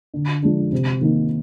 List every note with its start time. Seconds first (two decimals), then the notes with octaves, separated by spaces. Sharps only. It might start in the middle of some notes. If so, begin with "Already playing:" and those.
0.14 D3
0.42 F3 G#3 D4
0.72 C3
1.01 D#3 A#3 D#4